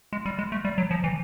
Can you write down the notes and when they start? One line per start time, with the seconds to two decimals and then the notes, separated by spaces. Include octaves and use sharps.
0.13 G#3
0.26 G3
0.39 G#3
0.52 A3
0.65 G3
0.78 F#3
0.91 F3
1.04 E3